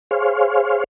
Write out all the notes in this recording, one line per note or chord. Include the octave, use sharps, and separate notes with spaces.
G#4 C5 C#5 F5